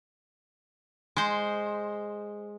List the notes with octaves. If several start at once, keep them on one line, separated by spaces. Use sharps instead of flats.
G#3 C5